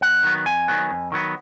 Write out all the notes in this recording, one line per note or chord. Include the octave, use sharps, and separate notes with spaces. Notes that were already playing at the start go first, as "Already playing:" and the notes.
F2 F#5
D#3 F#3 B3
F2 G#5
D#3 F#3 B3
F2
D#3 F#3 B3